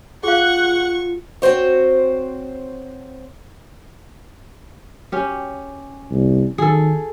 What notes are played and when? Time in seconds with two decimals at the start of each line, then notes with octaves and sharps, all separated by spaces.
0.23 F4 G#4 F5 F#5 C#6 F#6
1.42 C4 F#4 C5 C#5
5.12 C#4 G4
6.11 C2
6.58 D#3 G#4 A4